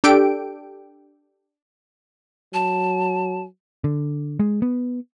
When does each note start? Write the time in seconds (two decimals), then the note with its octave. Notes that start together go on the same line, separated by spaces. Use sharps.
0.04 D4 G4 A4 G5 D7
2.54 F#3 A5
3.84 D3
4.40 G#3
4.62 B3